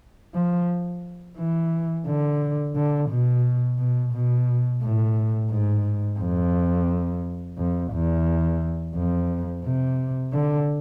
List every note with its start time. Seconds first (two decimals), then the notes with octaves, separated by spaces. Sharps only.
0.35 F3
1.38 E3
2.06 D3
2.75 D3
3.10 B2
3.79 B2
4.13 B2
4.82 A2
5.51 G#2
6.19 F2
7.58 F2
7.92 E2
8.95 F2
9.64 C3
10.33 D3